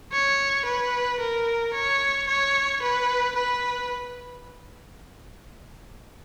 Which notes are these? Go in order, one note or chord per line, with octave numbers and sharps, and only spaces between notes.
C#5
B4
A#4
C#5
C#5
B4
B4